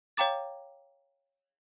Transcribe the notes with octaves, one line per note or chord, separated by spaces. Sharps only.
C#5 F5 G5 A#5 D6 A6